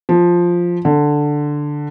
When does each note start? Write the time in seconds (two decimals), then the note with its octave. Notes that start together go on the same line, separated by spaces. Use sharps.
0.09 F3
0.85 D3